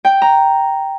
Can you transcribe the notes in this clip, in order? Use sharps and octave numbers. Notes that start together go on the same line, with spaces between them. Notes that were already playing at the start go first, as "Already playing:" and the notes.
G5
A#5